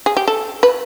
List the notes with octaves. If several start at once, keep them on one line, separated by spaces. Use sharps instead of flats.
G#4
G4
A4
B4